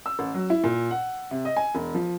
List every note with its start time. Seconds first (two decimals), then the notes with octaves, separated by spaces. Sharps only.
0.06 E6
0.19 A1
0.34 F#3
0.50 E4
0.64 A#2
0.91 F#5
1.31 C3
1.45 D#5
1.57 G#5
1.75 E1
1.94 F3